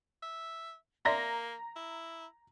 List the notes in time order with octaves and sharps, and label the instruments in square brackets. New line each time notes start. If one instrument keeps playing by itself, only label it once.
[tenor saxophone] E5
[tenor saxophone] A#3 [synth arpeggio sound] D5 E5 C6 [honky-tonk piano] A#5 A#6
[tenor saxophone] E4